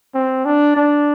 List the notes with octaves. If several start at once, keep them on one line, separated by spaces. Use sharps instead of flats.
C4
D4
D4